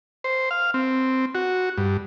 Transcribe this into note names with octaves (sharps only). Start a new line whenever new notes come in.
C5
F5
C4
F#4
G2